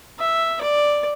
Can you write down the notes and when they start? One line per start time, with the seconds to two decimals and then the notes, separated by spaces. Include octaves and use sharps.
0.19 E5
0.61 D5